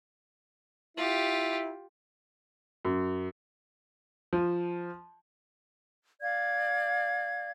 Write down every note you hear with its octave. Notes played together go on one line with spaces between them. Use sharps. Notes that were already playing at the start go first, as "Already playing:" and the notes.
E4 F4 G4
F#2
F3
D5 F5 G#6